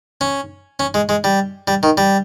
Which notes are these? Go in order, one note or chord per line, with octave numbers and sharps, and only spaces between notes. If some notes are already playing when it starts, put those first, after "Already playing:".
C#4
C#4
G#3
G#3
G3
G3
D#3
G3